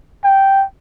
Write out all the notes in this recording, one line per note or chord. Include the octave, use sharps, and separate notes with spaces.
G5